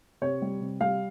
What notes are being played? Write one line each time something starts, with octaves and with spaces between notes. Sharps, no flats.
C3 C#5
G3
C3
G3 F5